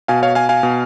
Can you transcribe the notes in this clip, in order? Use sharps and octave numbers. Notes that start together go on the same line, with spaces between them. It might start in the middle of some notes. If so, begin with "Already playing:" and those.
B2 F5 G#5
C#5 F5
F5 G#5
F5 G#5
B2